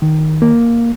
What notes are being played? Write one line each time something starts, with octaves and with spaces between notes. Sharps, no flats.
D#3
A#3